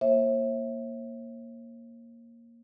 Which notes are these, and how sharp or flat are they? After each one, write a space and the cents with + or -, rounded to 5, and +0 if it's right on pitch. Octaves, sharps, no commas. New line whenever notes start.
A#3 +0 C#5 -45 E5 +0